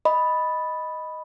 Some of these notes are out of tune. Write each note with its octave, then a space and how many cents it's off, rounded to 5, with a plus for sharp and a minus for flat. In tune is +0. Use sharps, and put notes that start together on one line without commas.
D#5 +0 B5 +0